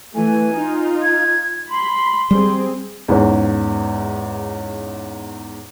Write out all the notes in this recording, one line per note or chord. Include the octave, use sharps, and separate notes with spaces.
E3 A3 G#5
D#4 F4
G#6
B5 C6
G3 C4 G#4
E2 G#2 C#4